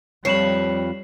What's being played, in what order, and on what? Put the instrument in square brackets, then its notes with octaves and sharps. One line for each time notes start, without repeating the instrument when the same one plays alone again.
[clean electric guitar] F2 F3 B4 [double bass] G3 [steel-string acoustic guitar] C#5 [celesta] C7 E7 F#7